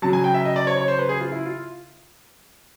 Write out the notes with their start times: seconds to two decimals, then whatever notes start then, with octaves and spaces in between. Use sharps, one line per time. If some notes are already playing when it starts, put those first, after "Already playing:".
0.02 C#3 F#3 A5
0.13 G#5
0.24 G5
0.34 E5
0.45 D#5
0.56 D5
0.67 C#5
0.77 C#5
0.88 C5
0.99 B4
1.09 G#4
1.20 F4
1.32 E4
1.46 F4